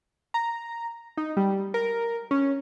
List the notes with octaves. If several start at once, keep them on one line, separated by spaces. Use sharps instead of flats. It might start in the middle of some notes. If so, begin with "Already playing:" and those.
A#5
D#4
G3
A#4
C#4